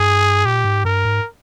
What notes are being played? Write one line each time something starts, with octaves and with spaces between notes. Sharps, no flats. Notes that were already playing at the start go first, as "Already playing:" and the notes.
Already playing: G2 G#4
A#2 G4
G#2
G2 A#4
G#2